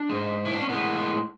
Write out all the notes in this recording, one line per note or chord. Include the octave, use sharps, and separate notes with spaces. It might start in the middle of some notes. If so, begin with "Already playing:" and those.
Already playing: D4
G#2 G#3
E4
D4
C#4
A2 G#3 B3